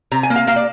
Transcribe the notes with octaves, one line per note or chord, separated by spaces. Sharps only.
C3 A#5
G#5
A#3
F5
A#3 F5
D5